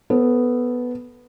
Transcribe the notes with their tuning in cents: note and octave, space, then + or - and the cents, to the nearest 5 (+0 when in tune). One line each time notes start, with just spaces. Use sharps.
B3 +0 A4 +0 C5 +45